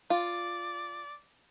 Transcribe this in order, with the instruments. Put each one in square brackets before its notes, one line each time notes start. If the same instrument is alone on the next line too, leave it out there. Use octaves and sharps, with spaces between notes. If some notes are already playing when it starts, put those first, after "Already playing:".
[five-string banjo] F4 [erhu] D5